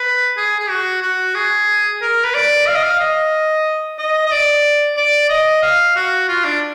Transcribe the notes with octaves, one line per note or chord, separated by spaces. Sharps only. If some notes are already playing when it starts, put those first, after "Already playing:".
Already playing: B4
G#4
G#4
F#4
F#4
G#4
A#4
B4
D5
F5
D#5
F5
D#5
D#5
D#5
D5
D5
D#5
F5
F#4
F4
D4